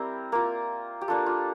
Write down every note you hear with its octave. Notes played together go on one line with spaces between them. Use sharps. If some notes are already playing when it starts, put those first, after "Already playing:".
Already playing: G3 C4 E4 A#4
A#3 F4 A#4
G4
A#3 D4 F4 A4
F4